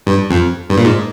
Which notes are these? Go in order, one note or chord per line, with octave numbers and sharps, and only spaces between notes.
G2
F2
G2
A#2
G#2